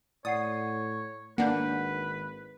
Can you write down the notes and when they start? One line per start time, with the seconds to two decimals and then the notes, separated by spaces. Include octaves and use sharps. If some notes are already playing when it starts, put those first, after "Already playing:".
0.25 A2 C#5 D5 F#5 D#6 C7
1.38 G#1 A#3 D4 B4 F#5 G6